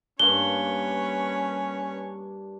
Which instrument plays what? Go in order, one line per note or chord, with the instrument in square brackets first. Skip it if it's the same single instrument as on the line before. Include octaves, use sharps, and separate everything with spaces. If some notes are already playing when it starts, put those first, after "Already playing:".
[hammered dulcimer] G2 A#3 D4 [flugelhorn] C#4 [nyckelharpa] B4 C#5 [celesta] G7